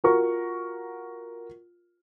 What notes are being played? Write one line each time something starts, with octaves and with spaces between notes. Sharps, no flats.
F4 F#4 A#4 C#6